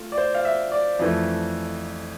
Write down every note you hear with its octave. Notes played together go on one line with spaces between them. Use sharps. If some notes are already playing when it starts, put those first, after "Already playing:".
Already playing: A3 F4
D5
C5
F5
E5
D5
F2 E3 A3